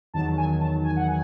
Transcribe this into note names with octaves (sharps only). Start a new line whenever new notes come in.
E2 D#3 F#3 A5
G#5
A5
G#5
F#5
G#5